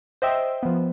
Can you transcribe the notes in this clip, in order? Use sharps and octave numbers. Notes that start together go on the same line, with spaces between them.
C5 D#5 E5 G5 E6
F3 B3